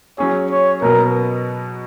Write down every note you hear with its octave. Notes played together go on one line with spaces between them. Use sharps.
F#3 C#4 G#4 C#5
C#5
B2 F#3 B3 A#4